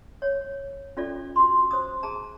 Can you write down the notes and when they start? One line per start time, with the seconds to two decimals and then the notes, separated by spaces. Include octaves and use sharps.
0.22 C#5
0.97 C#4 F4 A4 D5
1.36 F#4 C6
1.71 C5 D#6
2.03 G#4 A5 A#5